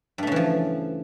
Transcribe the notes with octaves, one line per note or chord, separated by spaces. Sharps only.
G2 C#3 E3 F3 A3